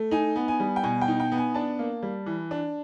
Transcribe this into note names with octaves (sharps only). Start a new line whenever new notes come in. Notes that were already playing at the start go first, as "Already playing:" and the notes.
Already playing: A3
D#4 G#5
B3
G#5
G3
G5
B2 G#5
G5
D#4
G5
B3
G#5
D4 A5
A#3
G3
E3
D4